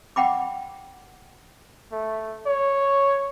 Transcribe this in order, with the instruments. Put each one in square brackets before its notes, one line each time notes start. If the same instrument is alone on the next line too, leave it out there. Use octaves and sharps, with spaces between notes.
[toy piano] F#5 G5 B5 D6
[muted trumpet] A3
C#5